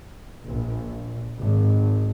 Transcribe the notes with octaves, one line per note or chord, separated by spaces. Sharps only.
A#1
G#1